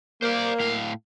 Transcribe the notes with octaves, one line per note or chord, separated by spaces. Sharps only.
A#3 C5 D5
A2 F5